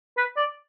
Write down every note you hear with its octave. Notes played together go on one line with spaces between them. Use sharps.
B4
D5